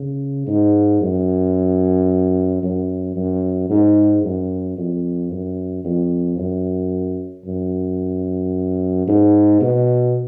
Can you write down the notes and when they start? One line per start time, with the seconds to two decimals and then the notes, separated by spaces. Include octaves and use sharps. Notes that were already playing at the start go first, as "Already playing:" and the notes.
Already playing: C#3
0.47 G#2
1.01 F#2
2.63 F#2
3.16 F#2
3.70 G#2
4.24 F#2
4.77 F2
5.32 F#2
5.84 F2
6.38 F#2
7.45 F#2
9.08 G#2
9.61 B2